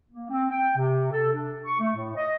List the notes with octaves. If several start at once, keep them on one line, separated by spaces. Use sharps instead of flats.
A#3
C4
G5
C3
A4
D4
C#6
A3
A2
D#5